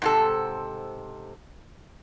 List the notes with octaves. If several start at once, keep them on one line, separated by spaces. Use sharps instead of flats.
G#2 C3 A4